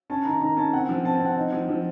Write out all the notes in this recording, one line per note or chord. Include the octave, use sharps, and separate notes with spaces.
C#4 A5
D#3 A#5
D#3 A#5
C#4 A5
C4 F#5
F3
C4 A5
A5
C4 F#5
D#4
F3
F3